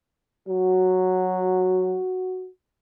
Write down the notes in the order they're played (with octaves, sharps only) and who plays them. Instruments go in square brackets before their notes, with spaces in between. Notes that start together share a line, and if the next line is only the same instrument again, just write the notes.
[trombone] F#3 [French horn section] F#4